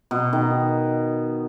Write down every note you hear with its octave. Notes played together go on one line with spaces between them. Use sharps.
B2
D#3